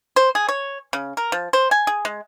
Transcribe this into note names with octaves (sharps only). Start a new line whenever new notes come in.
C5
G#4
C#5
C#3
A#4
F3
C5
G#5
G#4
G#3